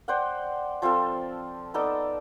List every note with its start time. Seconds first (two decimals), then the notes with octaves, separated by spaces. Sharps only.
0.08 C5 D5 F#5 G5
0.82 F3 C4 F4 A4
1.74 B3 D#4 A4 D5